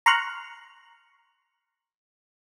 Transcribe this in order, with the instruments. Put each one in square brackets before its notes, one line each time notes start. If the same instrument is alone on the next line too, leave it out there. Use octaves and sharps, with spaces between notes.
[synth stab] A#5 C6 C#6 F6 F#6